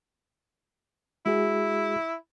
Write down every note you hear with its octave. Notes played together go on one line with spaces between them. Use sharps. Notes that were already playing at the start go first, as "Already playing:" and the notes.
G#3 E4 F#4 G#4